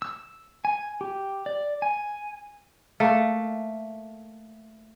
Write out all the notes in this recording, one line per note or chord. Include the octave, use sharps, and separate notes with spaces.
E6
G#5
G4
D5
G#5
A3 A#3